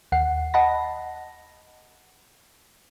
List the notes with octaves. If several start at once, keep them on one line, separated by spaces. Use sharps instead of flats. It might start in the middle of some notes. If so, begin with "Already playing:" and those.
D#2 F#5 C7
D#5 F#5 A5 B5 A#6